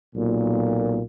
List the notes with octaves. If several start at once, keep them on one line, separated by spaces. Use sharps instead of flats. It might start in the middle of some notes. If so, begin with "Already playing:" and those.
B1 A#2